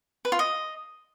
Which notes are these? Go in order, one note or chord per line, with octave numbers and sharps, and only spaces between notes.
B4
F4
D#5